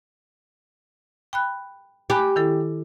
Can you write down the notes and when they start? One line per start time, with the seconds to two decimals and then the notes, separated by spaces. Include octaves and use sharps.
1.33 G5 B5 F#6
2.10 G4 G#5 B5 F#6
2.36 D#3 E4 A4